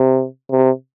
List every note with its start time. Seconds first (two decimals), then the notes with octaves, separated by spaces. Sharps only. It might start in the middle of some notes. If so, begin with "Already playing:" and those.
Already playing: C3
0.51 C3